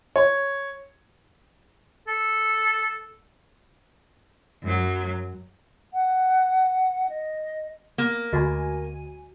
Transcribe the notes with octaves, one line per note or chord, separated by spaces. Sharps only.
C#5
A4
F#2 F#3
F#5
D#5
A#3
D2 F#4 D#5 G#5